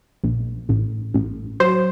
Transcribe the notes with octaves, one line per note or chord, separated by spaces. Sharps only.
A#1
A1
A1
F#3 C5